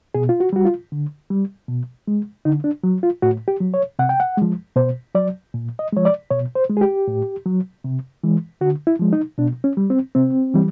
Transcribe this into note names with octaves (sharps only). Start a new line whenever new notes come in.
B2 G#4
F4
F#4
G3 F#4
F4
D3
G3
B2
G#3
D3 D#4
D4
F#3
F4
A2 F#4
G4
F#3
C#5
C3 F#5
G5
F#5
F3 G#3
B2 C5
F#3 D5
A#2
D#5
F3 G#3 C#5
D5
B2 C#5
C5
G#3
G#4
G4
A2
F#3
C3
E3 G#3
D3 F#4
E4
F3 G#3
D#4
B2 D4
C#4
G3
C4
C3 C4
E3 G3